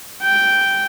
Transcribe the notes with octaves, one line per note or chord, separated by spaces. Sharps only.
G5